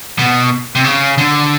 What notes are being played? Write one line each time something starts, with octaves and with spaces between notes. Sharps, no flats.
B2
C3
C#3
D3